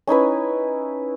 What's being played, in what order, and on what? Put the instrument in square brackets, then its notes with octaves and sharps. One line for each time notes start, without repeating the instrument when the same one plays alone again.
[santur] C#4 D#4 E4 B4